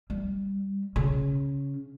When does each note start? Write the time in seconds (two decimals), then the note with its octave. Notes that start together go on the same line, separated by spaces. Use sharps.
0.10 G3
0.96 C#3 C#4